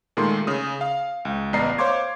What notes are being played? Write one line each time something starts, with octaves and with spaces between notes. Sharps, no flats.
A#2 D#3 G#3 A3 C6
C#3 D#6
F5
C#2
A1 B3 D5 D#5 A#5 C7
C5 C#5 F5 C6 D6 G#6